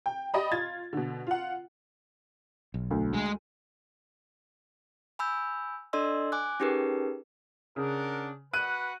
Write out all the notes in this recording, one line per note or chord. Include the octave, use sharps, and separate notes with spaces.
G5
G4 D5 D#5 B5
F4 G#6 A6
B2 D3
F4 F#5
B1
D2
G#3
G#5 B5 E6 G6
D4 A4 D5 D#5 C6 E6
G#5 D6 F#6
C#4 D#4 G4 G#4 A#4 B4
C#3 D4 A#4 F#5
F#4 B4 F#5 F#6 D#7